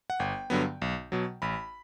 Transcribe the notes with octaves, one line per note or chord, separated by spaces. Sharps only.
F#5
G1 G5
G2 D3 F#3 B3
B1
B2 F#3
A1 B5